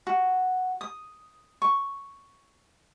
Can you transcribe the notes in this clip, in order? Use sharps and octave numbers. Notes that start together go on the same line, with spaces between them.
F#4
D#6
C#6